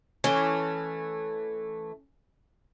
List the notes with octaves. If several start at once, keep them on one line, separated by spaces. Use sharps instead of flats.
E3 A3 C#4 C6 D6